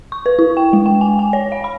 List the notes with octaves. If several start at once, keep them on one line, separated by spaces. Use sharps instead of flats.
C#6
B4
E4
G5
G#3
G5
G#5
G#5
C#5
F5
B5